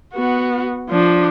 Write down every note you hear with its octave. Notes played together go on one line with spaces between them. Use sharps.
B3 F#4
F3 D4